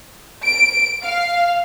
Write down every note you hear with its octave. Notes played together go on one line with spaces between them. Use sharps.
D7
F5